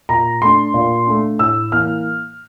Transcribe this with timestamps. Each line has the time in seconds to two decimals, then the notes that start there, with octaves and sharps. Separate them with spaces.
0.09 A#2 A#5
0.42 A3 D4 C6
0.74 A#2
1.06 A3 D4
1.39 A2 E6
1.72 E3 A#3 F6